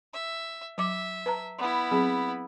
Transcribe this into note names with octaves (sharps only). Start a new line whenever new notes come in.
E5
F#3 E5 D6
B4 A5 A#5
B3 E4
F#3 C4 G#4